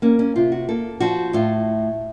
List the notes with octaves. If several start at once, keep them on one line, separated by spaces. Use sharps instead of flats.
A#3 C#4
C#4
C3 F4
F#4
A#3 A4
F3 F#4
A2 F4